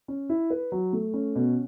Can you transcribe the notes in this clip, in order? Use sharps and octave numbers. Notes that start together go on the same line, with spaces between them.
C#4
E4
B4
F#3
A3
C#4
B2